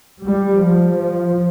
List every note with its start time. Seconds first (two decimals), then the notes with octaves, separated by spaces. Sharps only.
0.24 G3
0.59 F3
0.96 F3